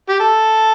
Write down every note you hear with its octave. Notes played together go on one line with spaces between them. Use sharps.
G4
A4